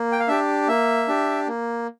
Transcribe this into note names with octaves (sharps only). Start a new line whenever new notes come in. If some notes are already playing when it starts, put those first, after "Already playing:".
Already playing: A#3
G5
F5
D4 G4 E5
A#3 E5
D4 G4
A#3